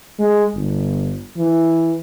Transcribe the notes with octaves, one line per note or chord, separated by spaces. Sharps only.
G#3
G1
E3